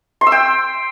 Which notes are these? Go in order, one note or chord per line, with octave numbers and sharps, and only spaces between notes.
C6
E6
G5